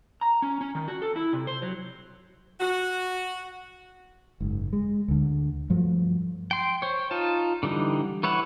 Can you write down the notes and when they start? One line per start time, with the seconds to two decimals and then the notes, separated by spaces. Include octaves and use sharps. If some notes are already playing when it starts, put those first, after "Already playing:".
0.21 A#5
0.42 C#4
0.61 C#4
0.75 D#3
0.88 F#4
1.02 A4
1.16 E4
1.33 C3
1.47 C5
1.62 F#3
2.60 F#4
4.40 F#1 G#2
4.73 G#3
5.08 D2 D3
5.70 G2 F3 F#3 A3
6.51 G5 C6
6.82 C5 C#5
7.11 D#4 F4 A5
7.63 D3 E3 G3 D#4
8.23 E3 B4 C#5 E5 F#5